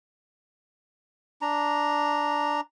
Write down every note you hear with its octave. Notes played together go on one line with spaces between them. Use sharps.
D4 A#5